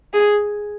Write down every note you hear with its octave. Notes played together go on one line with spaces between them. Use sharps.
G#4